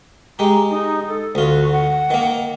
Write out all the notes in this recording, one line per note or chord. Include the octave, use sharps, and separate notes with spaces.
G#3 G4 A#5
D#4
A4
D2 F4 F#4
F#5
D#3 A#3